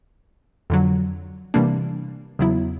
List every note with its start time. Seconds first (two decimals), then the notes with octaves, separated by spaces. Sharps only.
0.70 F2 D3 F#3
1.54 C3 E3 G3 A#3 D4
2.39 E2 C#3 F#3 B3 E4